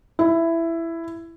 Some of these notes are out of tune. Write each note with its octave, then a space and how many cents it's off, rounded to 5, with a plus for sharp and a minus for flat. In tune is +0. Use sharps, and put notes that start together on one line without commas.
E4 +10